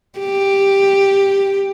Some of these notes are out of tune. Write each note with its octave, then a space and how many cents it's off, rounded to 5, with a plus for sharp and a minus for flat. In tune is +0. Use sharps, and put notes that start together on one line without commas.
G4 +5